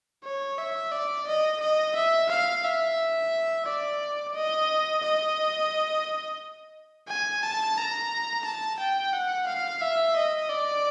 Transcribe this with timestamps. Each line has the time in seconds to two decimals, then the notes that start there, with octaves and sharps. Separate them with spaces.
0.24 C#5
0.58 E5
0.92 D5
1.27 D#5
1.60 D#5
1.95 E5
2.30 F5
2.64 E5
3.66 D5
4.34 D#5
5.03 D#5
7.09 G#5
7.43 A5
7.77 A#5
8.45 A5
8.80 G5
9.13 F#5
9.47 F5
9.81 E5
10.16 D#5
10.49 D5